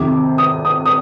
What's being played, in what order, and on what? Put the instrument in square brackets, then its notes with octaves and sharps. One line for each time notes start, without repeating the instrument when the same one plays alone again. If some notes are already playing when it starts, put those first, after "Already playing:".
Already playing: [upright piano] F2 C3 D#3 D6
D#6
D#6
D#6